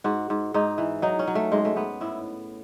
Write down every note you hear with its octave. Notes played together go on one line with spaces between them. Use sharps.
G#2 F#4
G#2
G#2 D#4
E3
F#3 D#4
C#4
F#3
A3
G#2 G#3
A3
G#2 B3
A2 E4